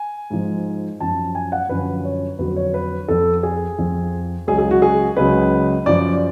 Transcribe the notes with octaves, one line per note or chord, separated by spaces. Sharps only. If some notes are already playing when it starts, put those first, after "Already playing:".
Already playing: G#5
G#2 F3
F#2 F3 A5
G#5
F#5
F#2 D3 F3 B4
C#5
F2 D3 F#3 B4
C#5
B4
F2 F3 A4
G#4
F2 F3
C#2 C#3 F#3 G#4
G#4
F#4
G#4
C#2 C#3 F#3 B4
F#2 F3 D5